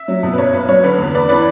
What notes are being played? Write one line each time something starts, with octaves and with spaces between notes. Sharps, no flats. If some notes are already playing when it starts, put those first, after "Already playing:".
Already playing: E5
F#3
B2
B4
B1 C#5
B1 B4
F#3 C#5
D3 B4
E2
E2 B4 D5
E3 B4 D5